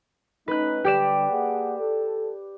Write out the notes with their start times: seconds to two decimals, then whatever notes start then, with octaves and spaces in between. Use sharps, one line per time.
0.48 A3 C#4 D#4 B4 F#6
0.85 D3 G3 G4 D5 E7
1.30 A#3 G#4 F#5
1.79 A4